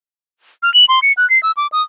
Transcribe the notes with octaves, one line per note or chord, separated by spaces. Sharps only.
F6
F#7
C6
C#7
F#6
C7
E6
D6
D#6